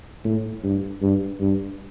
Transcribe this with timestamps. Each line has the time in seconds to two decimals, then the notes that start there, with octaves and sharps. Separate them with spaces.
0.25 A2
0.63 G2
1.02 G2
1.40 G2